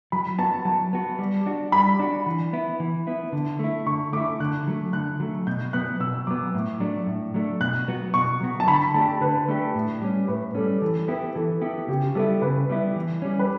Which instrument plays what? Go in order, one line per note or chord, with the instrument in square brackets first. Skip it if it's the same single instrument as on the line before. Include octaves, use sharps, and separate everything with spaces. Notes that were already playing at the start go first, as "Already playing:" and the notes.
[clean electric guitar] F#3 [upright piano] B5
[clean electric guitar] B3 F#4 [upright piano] A5
[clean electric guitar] F#3 [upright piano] A5
[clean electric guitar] B3 F#4
G3
D4 F#4
[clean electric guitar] G3 [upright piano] B5
[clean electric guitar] D4 F#4
E3
B3 E4
E3
B3 E4
D3
A3 E4
[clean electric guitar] D3 [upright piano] C#6
[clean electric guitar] A3 E4 [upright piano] D6
[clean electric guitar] D3 [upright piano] F#6
[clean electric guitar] F#3 A3
[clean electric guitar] D3 [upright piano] F#6
[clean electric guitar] F#3 A3
[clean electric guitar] B2 [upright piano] G6
[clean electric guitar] F#3 B3 [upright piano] F#6
[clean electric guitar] B2 [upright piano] E6
[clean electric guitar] F#3 B3 [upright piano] D6
[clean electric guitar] A2
F#3 A3 D4
A2
F#3 A3 D4
[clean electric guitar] B2 [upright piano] F#6
[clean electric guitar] F#3 B3 F#4
[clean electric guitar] B2 [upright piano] C#6
[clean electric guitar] F#3 B3 F#4
[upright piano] A5
[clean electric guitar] D3 [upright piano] B5
[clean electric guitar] A3 D4 G4 [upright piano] A5
[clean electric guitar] D3 [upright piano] B4
[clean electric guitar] A3 D4 G4
A2
G3 C#4
[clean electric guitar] A2 [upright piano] B4
[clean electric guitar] G3 C#4 [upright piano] A4
[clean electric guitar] E3 [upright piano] A4
[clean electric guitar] B3 E4 G4 [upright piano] B4
[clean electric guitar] E3 [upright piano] A4
[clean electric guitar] B3 E4 G4
[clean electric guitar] C#3 [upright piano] G4
[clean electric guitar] G3 B3 E4 [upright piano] A4
[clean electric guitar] C#3 [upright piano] B4
[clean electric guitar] G3 B3 E4
E3
G3 C#4
[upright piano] B4